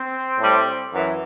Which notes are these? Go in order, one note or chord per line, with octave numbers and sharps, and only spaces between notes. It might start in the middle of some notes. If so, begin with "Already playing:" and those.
Already playing: C4
A2 G3
F#2 E3